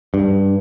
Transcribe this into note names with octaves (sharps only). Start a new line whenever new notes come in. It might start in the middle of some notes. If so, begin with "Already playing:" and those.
G2